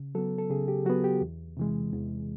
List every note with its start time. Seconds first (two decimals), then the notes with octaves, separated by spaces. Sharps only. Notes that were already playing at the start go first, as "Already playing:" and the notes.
Already playing: C#3
0.15 F#3 B3 A4
0.38 A4
0.50 C#3 G#4
0.68 G4
0.85 F#3 F#4
0.89 B3
1.04 G4
1.21 E2
1.57 C3 E3 G#3
1.92 E2